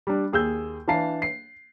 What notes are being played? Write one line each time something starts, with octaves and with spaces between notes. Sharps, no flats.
G3 D4
D#2 G#4 E6 G6
E3 D4 F5 A5 C7
C7